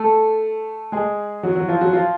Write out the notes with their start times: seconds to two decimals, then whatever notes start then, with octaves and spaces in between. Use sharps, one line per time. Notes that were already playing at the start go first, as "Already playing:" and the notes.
Already playing: A3 A4
0.92 G#3 G#4
1.43 F#3 F#4
1.55 F#3 F#4
1.68 F3 F4
1.81 F#3 F#4
1.93 F3 F4